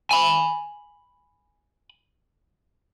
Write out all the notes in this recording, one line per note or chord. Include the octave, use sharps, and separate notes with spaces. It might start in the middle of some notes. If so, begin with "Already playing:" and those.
G#5 B5